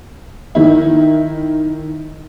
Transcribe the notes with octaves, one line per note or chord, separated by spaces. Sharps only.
D#3 E4